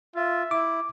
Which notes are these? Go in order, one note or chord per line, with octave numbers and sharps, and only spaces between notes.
F4 E5
E4 D6